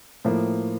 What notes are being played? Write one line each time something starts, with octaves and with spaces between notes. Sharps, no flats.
A2 F3 A#3